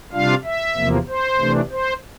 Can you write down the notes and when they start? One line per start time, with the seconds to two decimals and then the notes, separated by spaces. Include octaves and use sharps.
0.12 C3 G3 D4 F4 F5
0.44 E5
0.76 E2 C3 F3 A#3
1.08 C5
1.39 C3 E3 A3 D4
1.71 C5